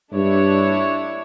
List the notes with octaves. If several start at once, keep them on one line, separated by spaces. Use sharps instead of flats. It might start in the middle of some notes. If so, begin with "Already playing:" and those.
G2 D4 E4 C#5